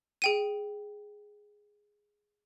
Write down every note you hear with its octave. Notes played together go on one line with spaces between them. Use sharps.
G#4 G5 D#7